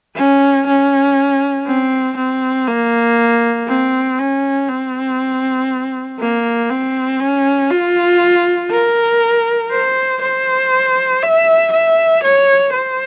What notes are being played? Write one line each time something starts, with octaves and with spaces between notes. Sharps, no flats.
C#4
C#4
C4
C4
A#3
C4
C#4
C4
A#3
C4
C#4
F4
A#4
C5
C5
E5
E5
C#5
C5